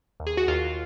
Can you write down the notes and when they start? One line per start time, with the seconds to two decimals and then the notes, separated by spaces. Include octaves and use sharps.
0.20 D#2
0.27 G#4
0.37 F#4
0.48 D#2 F4